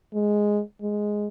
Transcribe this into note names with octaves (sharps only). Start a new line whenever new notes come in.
G#3
G#3